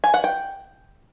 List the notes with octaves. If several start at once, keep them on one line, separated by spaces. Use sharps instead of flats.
G#5
F#5
G5